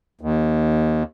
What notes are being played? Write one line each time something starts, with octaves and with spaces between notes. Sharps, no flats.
D#2